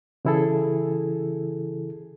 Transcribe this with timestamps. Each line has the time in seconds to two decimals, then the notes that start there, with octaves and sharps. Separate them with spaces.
0.25 C#3 E3 E4 G#4 A4